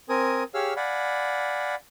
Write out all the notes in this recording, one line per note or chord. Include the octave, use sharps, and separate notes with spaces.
C4 A#4 G#5 D#6
G4 G#4 C#5 F5 E6 F6
D5 F5 F#5 G#5 B5